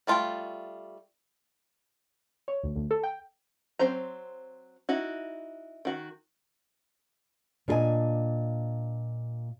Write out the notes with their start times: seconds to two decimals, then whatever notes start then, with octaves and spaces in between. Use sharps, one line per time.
0.07 G3 A3 F4 B4 G5
2.48 C#5
2.63 D2
2.75 D2
2.91 A4
3.03 G5
3.79 F#3 C4 C5 A#5
4.89 D#4 E4 F#4
5.85 D#3 F#4
7.68 A#2 D4 G#4 B4 D#5 G#5